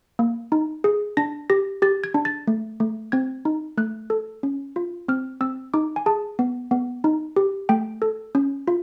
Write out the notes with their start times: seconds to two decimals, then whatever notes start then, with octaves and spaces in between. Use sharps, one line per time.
0.19 A#3
0.52 D#4
0.84 G#4
1.17 D4 A#6
1.50 G4 A#6
1.82 G4 A6
2.04 G#6
2.14 D4
2.25 A6
2.47 A3
2.80 A3
3.12 C4 G#6
3.45 D#4
3.78 A3 F#6
4.10 A4
4.43 C#4
4.76 F4
5.08 C4 F6
5.41 C4 E6
5.74 D#4 D6
5.96 G#5
6.06 G#4 A5
6.39 B3
6.71 B3
7.04 D#4
7.36 G4
7.69 A3 G5
8.02 A4
8.35 C#4
8.68 F4